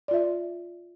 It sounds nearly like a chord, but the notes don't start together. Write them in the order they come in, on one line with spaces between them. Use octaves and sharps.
D5 F4 E5